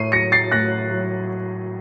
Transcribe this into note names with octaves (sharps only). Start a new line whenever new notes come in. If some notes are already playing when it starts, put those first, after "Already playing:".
Already playing: A2 C7 D#7
F#3 A#6 C#7
A6 C7
A2 F#6 A#6
F#3